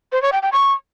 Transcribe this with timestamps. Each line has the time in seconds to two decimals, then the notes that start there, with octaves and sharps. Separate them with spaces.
0.12 C5
0.22 C#5
0.32 G5
0.42 G5
0.53 C#6